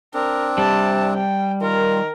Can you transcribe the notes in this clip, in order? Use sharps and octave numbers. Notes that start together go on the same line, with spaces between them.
C4 D4 A#4
C3 G3 A5
G5
D#3 F4 A#4